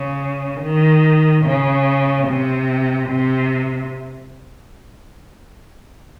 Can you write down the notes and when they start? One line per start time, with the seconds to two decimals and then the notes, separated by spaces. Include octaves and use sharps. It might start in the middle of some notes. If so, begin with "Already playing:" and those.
Already playing: C#3
0.62 D#3
1.45 C#3
2.27 C3
3.09 C3